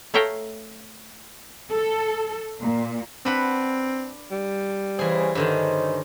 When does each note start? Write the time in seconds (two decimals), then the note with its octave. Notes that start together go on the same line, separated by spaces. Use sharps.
0.14 A3 C#5 E5 F5 G5 A#5
1.71 A4
2.61 A#2
3.25 C4 D4 B4 F#5
4.31 G3
4.99 C#3 E3 G#4 C5
5.35 G2 D3 D#3 C#4 D#4 C5